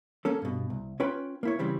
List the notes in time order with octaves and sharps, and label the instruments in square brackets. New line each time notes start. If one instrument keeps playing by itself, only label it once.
[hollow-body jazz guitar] A#3 C#4 A4
G2 B2
C2
C#4 F4 B4 G5 B5
A#3 E4 C#5
C#3 E3 G3 C4